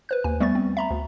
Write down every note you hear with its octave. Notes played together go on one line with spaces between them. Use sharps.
B4 C5 F#6
D#2 G#5
G3 A3 B3 C#6 A6
C4
E5 A#5 B5
D2